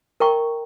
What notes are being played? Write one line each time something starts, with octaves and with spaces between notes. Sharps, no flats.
A#4 D#5 G5 A#5 C#6